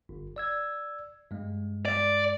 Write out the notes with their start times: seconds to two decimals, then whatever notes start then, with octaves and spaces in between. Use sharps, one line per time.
0.09 G1
0.36 D5 E6 G#6
1.31 G2 G#3
1.85 D5